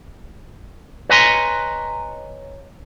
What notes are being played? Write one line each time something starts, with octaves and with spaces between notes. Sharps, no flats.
B4 C#5 D#5 G#5 A#5 C6